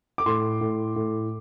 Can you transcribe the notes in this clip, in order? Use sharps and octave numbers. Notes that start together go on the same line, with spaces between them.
D6
A2 C6
A2
A2